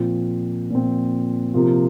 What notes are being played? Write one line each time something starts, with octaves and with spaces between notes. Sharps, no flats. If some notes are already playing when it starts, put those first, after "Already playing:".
Already playing: A#2 F3 C4
A#2 F3 C4
C3 F3 A#3 F4